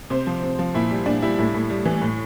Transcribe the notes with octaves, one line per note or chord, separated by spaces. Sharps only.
C3 C5
F3
C3
F3
A#2 E4
G3
A#2 D4
G3 E4
A2 E4
A2
G3
E3
A2